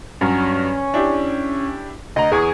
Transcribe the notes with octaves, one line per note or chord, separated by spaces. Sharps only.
G2 F#3 C#4
D4 E4 G4
D2 D#5 A#5
E2 G#4 C#6 G#6